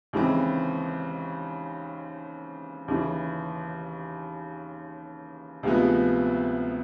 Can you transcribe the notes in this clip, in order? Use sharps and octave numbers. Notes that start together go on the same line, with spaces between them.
D#2 C#3 E3 G#3 C4
D#2 C#3 E3
D2 C3 F3 G#3 B3